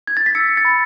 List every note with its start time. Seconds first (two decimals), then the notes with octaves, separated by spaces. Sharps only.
0.07 G#6
0.17 A6
0.26 B6
0.35 E6 A6 C#7
0.57 A6
0.65 B5